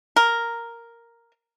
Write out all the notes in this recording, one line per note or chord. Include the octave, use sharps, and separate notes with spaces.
A#4